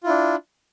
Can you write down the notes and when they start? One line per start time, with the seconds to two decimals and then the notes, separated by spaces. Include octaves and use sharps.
0.03 F4
0.06 E4
0.08 D4